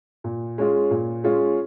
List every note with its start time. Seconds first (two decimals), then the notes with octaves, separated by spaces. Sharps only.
0.24 A#2
0.58 G#3 C#4 F4 G#4
0.91 A#2
1.24 G#3 C#4 F4 G#4